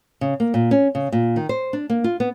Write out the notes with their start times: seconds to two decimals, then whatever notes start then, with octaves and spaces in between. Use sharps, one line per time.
0.21 C#3
0.40 A#3
0.54 A#2
0.71 C#4
0.95 C#3
1.12 A#2
1.36 D#3
1.49 C5
1.73 D4
1.90 A#3
2.04 F4
2.20 B3